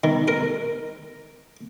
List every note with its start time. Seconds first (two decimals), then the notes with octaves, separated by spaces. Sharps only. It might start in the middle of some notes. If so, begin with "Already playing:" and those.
0.04 D#3
0.28 A#4